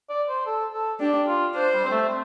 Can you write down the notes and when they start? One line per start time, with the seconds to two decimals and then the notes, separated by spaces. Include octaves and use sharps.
0.09 D5
0.29 C5
0.46 A4
0.73 A4
1.00 D4 G4
1.27 F4
1.55 D4 C5
1.73 G3
1.84 C4
1.91 A3
2.09 C4